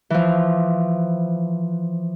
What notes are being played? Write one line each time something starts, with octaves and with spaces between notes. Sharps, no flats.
E3 F3